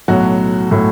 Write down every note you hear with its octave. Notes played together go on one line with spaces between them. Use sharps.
B1 A2 F#3 F#4
A2 F#3